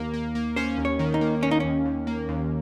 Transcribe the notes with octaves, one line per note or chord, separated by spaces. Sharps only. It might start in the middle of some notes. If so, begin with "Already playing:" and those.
Already playing: D#2 A#3 A#4
A#3
A#3
C#4 C5
D#2
C#5
D#3
D#4
A#3
D#3 C#4
D#4
D#2 C#4
D#2
A#3
D#2